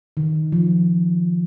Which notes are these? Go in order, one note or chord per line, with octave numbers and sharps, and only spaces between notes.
D#3
F3